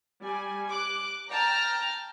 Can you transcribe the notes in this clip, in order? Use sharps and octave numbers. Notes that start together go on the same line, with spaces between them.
G3 G#5
D6 F#6
G5 A5 A#5 F6